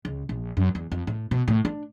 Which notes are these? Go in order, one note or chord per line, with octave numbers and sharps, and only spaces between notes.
C#2
A#1
F#2
E2
F2
A2
B2
A2
D4